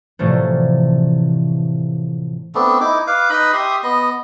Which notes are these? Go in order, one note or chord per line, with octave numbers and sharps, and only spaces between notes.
A2 C3 E3 F3 G3 A3
A3 B3 C4 D4
D#4 E4 D6
B4 F5 D6
D#4 B4 D#5 B5
G4 E5 C6 D#6
B3 D#5